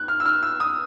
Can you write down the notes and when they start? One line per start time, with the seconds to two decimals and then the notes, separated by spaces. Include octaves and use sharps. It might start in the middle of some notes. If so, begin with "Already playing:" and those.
Already playing: F#6
0.08 F6
0.20 E6
0.25 F6
0.43 E6
0.60 D#6